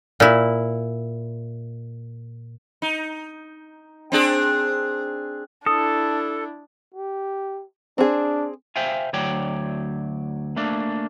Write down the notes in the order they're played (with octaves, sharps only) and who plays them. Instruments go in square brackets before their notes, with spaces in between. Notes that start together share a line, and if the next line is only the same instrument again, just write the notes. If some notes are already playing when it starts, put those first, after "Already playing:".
[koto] A#2 E4
[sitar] D#4
C4 D4 G#4
[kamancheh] D4 E4 [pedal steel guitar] A4 [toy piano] D#6
[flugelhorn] G4
[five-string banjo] C4 G#4 [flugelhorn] D4
[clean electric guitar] C5 E5 F5 G5 G#5
D2 F#3 C#5 D5 G5
A3 A#3 D4